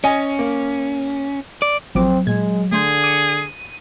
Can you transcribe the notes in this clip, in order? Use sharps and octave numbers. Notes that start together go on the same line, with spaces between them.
C#4 D#5 G#5
A#3
D5
A1 F3 F#3 C4 D6
A#2 G#3 G#6
D3 A3 G#4 C6 G6
D6 C#7 D#7